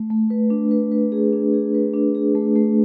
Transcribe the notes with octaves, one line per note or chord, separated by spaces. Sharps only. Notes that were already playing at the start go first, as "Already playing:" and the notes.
Already playing: A3
A3
B4
D4
B4
B4
G#4
D4
G#4
B4
D4
G#4
A3
A3